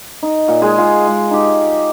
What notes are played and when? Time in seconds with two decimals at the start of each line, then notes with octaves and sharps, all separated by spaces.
0.23 D#4
0.48 A#2
0.62 G#3 G#4
0.78 F4
1.07 G#3
1.31 D#4 G4